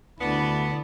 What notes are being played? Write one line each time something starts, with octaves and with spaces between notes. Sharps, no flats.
D2 D3 B3 E4 D5 A5